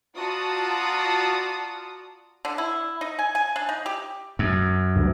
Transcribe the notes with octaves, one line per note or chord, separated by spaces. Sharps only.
F4 F#4 D5 A5 A#5 D#6
D3
E4
D#4
G#5
G#5
D4
D#4
G4
F#2
D2 G2